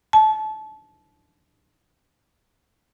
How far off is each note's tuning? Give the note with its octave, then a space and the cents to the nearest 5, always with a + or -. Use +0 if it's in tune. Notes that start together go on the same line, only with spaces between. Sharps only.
A5 -25